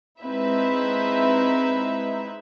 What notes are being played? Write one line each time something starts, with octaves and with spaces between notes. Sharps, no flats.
G#3 C4 D#4 E4 B4 E5